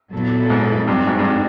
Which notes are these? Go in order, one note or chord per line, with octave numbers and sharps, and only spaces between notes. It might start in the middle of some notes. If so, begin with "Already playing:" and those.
A#2 F#3 B3 E4 A4
G#2
G2 F#3 A3 C4 D#4 F#4
G#2
G2